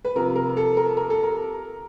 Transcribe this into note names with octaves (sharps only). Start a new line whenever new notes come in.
B4
C3 F3 A#4
A#4
A4
A#4
A#4
A4
A#4